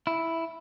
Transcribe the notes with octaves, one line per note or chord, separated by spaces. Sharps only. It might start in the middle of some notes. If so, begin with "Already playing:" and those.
E4